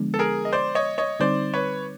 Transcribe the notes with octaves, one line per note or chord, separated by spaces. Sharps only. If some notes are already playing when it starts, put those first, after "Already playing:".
Already playing: D3 F3 G#3 B3 D4
A4
G#4 A#4
D#5
C5 D5
C#5 D#5
C#5 D#5
D3 G3 C4 D#4 C5 D5
B4 C#5